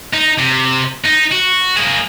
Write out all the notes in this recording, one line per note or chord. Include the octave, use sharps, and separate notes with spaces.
D#4
C3
D#4
F#4
A#3 G#4